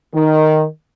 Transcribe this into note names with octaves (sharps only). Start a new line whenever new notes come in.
D#3